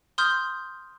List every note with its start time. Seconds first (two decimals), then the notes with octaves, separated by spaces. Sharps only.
0.18 C6 D#6 F6 G6